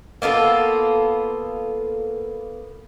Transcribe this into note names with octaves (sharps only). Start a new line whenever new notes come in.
A#3 B3 F4 A4